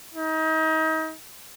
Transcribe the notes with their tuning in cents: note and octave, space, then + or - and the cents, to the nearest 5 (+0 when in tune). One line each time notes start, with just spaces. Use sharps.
D#4 +35